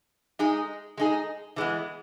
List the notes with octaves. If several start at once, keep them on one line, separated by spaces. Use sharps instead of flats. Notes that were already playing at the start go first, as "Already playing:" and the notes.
G#3 D#4 G#4
G#3 D#4 G#4
E3 G#3 B3